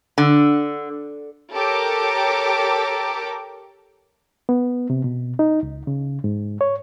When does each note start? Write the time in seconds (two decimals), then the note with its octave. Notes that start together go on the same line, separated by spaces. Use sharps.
0.18 D3
1.54 G4 A4 A#4 C#5 A#5 D6
4.49 B3
4.90 C3
5.04 B2
5.39 D#4
5.63 C#2
5.87 C#3
6.24 G#2
6.61 C#5